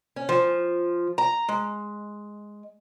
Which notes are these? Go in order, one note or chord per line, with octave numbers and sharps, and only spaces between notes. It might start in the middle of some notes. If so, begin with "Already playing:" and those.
C#4
F3
A#5
G#3